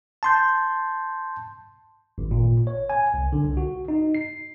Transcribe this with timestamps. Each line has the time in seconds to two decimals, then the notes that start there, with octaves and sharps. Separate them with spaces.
0.23 A5 C6 G6
2.18 G#1
2.31 A#2
2.67 C#5
2.90 G#5
3.14 C2
3.32 D3
3.45 C2
3.57 F#4
3.88 D#4
4.15 C7